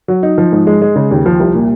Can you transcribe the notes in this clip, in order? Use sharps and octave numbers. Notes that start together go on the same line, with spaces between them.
F#3
D#4
F3
G#2
G#3
G#3
C#3
D#2
F3
C2
A#2